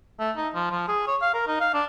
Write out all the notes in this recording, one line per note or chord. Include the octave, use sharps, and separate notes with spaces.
A3
D#4
F3
F3
G#4
C#5
F5
A#4
D#4
F5
D4